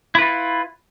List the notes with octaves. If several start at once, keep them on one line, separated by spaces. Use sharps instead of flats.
E4 F4 B4